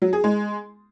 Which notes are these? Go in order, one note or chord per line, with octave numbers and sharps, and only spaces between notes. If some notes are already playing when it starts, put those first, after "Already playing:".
F#3
G#4
G#3